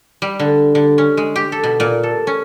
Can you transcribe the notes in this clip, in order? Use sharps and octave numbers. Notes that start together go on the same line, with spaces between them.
G3
D3
D3
C#4
G#3
G4
A4
B2
A#2
A4
C#4